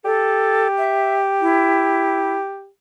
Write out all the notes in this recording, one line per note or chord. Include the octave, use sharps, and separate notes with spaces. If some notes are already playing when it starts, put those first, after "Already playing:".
G4 A4
E5
E4